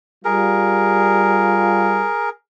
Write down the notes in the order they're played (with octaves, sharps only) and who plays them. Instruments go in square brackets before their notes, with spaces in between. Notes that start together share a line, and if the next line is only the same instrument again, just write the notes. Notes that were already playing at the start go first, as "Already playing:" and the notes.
[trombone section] G3 F4 [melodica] G#4 A#4